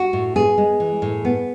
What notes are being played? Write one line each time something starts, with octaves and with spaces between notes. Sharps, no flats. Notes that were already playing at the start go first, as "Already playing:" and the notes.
Already playing: F#4
A2
B3 G#4
G#3
E3
A2
B3